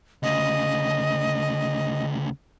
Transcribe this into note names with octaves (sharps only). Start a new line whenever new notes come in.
D2 C#3 D#5